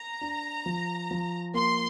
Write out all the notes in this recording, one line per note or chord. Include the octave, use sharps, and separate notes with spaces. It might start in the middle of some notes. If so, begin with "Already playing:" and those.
Already playing: A#5
D4
F3
F3
A#3 C6